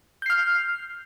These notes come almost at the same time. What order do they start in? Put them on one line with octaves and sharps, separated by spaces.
G6 C7 F6